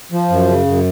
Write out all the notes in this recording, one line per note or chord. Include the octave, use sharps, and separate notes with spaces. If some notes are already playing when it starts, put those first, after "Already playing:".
F3
F#2
C#3
F#2